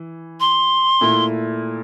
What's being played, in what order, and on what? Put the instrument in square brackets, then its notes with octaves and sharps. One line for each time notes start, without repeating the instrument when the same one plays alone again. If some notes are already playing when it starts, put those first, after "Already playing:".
Already playing: [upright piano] E3
[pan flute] C6
[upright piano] A#2 A3 E4